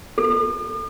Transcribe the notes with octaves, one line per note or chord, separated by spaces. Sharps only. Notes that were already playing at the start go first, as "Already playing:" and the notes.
A4